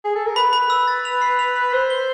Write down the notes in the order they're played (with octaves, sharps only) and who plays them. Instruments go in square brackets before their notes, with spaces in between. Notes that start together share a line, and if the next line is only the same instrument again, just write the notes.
[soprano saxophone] G#4
A4
A#4
[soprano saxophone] B4 [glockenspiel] B5
[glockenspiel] B5
E6
A6
F7
C7
F7
F7
[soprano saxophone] C5 [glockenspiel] E6
[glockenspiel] G7